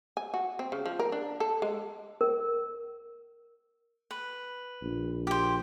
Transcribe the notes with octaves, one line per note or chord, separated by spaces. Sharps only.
G#5
F#4
C4
C#3
F3
A#4
D4
A4
G#3
A#4
B4
A#1
G4 C5